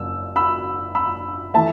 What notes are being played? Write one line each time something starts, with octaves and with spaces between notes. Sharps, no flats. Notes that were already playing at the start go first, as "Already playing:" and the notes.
Already playing: F#1 F#2 E6
B5 E6
B5 E6
E3 A3 E5 A5